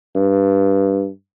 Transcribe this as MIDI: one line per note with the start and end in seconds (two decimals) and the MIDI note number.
0.15 1.09 43